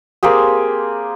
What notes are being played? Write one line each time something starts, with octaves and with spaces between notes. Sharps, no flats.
A#3 C4 G4 G#4